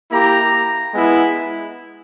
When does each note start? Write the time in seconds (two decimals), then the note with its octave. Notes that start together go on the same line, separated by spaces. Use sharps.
0.11 A#3 E4 G4 A#5
0.94 G#3 B3 E4